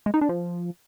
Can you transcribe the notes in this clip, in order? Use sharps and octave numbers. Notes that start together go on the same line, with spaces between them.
G#3
D#4
D4
F3